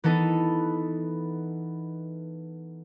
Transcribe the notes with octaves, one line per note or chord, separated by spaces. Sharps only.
E3 B3 D#4 A4